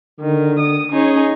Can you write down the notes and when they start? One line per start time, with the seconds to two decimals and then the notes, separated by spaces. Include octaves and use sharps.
0.20 D3 D#3
0.59 D#6
0.92 C#4 D#4 G#4 C#5